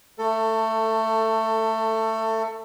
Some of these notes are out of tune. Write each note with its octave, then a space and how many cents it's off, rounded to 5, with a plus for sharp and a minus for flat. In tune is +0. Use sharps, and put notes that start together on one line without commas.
A3 +15 A4 +25